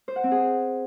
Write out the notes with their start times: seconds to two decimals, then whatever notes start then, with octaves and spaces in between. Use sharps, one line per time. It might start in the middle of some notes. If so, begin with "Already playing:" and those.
0.08 C5
0.16 F#5
0.24 C4
0.31 G#4